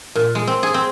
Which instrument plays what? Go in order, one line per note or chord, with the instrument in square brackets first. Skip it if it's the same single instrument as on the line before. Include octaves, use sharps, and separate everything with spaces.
[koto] A#2
G#3
C4
G#4
C4